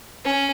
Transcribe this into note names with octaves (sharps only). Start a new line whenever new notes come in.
C#4